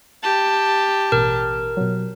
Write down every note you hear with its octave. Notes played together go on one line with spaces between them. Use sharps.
G4 A5
A1 B2 A#4
B2 F#3